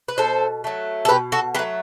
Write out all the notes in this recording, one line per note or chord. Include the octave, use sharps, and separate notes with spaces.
B4
B2 A4 C5
F#3 A3
A4
B2 G4 B4
F#4 A4
F#3 A3 G4 B4